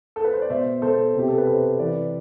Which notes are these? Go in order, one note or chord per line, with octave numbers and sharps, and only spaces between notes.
A4
B4
C5
D5
B2 C5 E5
B2 A4 C5
C3 G4
A4
B4
C3 A4 C5
E3 B4 D5